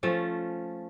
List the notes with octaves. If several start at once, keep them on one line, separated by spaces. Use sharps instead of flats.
F3 A3 C#4